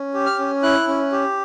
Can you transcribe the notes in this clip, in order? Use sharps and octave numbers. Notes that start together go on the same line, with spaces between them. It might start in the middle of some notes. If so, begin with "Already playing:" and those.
Already playing: C#4
G4
F6
C#4
E4 F#6
C#4
G4